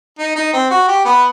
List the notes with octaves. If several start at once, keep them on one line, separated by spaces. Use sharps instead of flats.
D#4
D#4
C4
F#4
G4
B3